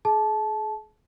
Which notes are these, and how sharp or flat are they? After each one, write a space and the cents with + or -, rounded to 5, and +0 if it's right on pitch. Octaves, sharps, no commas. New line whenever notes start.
G#4 +35 A5 -20